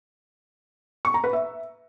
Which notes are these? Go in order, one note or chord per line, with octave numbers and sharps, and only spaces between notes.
C#6
A#5
B4
E5